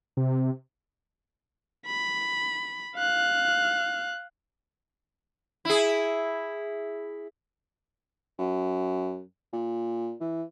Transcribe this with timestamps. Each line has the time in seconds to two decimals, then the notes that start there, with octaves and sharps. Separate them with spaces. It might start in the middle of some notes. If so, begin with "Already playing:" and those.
0.17 C3
1.86 B5
2.96 F5 F#6
5.65 E4 G#4
8.39 F#2
9.53 A#2
10.21 E3